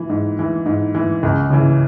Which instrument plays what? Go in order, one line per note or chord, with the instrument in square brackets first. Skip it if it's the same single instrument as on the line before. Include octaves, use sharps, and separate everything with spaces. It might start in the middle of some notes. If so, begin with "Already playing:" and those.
Already playing: [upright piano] E3
G#2
E3
G#2
E3
C#2
C#3 E3